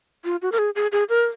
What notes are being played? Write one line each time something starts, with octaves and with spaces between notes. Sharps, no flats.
F4
F#4
A#4
G#4
G#4
G#4
A#4